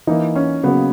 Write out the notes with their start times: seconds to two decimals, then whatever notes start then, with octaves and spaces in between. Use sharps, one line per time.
0.07 E3 A#3 D#4 E4
0.35 C#4
0.63 C#3 F#3 A#3 B3